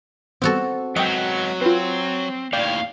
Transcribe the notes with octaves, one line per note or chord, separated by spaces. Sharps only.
G3 B3 C4 F#4 A4
F#3 G#3 B4 D#5 E5 F#5 G5
C4 F4 B4
D#2 A2 D5 F5 G5